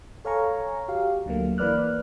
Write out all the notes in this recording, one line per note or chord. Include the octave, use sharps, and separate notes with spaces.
A4 C#5 F5 G#5 A#5 C#6
F#4 G4 F5
D2 D3 F#3 A3 A#3
E3 A#3 B4 D5 F6 F#6